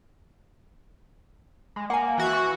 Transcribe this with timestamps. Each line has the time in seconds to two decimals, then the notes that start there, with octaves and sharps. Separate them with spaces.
1.76 G#3
1.90 A#3 F#5 G#5
2.18 E3 F#4
2.33 C#6